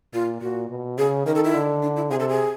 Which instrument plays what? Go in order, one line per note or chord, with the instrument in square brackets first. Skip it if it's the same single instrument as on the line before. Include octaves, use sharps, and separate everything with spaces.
[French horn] A#2 [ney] F4
[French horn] A#2 [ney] F#4
[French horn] B2
[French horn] C#3 [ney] G#4
[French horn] D#3 [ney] A#4
[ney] A4
E4
[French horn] D3
[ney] D4
E4
[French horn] C3 [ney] G#4
[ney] A4
G#4